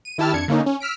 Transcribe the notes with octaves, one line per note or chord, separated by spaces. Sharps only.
D#7
D#3 E4 G4 A5 E6 F6
F2 D4 G#6 C#7
D3 A#3 C#4 D#4
C#4
E6 F6 B6 D7